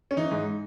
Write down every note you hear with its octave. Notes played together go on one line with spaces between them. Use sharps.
C#4
E3 D#4
G#2